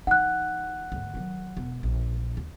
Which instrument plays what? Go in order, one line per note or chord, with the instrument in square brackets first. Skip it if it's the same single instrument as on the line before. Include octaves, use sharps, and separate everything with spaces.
[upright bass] E3 D#4 [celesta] F#5 F#6
[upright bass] D2 G#2
D#3 F#3
E1 B3
A#1
D#2